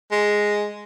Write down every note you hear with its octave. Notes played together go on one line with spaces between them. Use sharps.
G#3